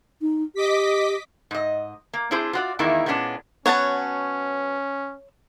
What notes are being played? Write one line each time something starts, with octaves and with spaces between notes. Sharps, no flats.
D#4
G4 D#5 D6 B6
G#2 D#5
A#3
C4 D4 E4 G#4 C5
F4 F#4 D5
E2 D#3 G#3 A#3 E4
A#2 G#3 B3 C#4 D4
F#3 B3 C#4 C#5 F#5 A5